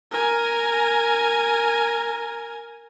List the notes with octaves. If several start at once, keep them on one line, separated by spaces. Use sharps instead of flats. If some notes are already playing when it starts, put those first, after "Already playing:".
A#4 G#5